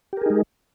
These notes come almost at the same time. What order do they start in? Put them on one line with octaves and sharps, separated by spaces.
G4 A#4 G#4 D#4 G#3